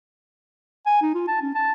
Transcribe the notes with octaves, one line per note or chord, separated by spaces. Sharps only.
G#5
D#4
F4
A5
C#4
A5